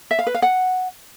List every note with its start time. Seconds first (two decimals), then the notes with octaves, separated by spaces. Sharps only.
0.11 E5
0.19 F5
0.27 B4
0.34 F5
0.42 F#5